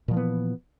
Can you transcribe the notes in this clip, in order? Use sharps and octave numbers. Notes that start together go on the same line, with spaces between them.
A#2 E3 F3 B3